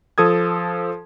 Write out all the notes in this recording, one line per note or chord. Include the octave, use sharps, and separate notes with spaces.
F3 A4 D#6 G#6